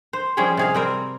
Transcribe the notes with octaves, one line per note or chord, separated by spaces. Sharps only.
C5
F3 G3 C#4 G#4 G5
C3 G#4 F5
G3 C4 A#4